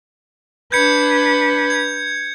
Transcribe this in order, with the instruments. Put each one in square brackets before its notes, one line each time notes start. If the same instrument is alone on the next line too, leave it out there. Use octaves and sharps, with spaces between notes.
[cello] D4 B4 [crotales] G6 G#6 C#7
[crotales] G#6